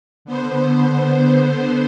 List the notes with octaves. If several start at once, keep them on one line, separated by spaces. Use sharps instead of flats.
D3 B3 C5